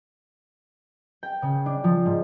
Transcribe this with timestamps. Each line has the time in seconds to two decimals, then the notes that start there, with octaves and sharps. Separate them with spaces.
1.23 G5
1.42 C#3
1.66 D4
1.84 F3
2.05 G#2